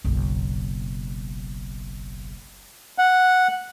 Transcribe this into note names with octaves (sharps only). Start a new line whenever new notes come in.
F#1 B1
F#5